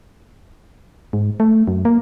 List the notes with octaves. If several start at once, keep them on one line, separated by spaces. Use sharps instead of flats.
G#2
A3
F#2
A#3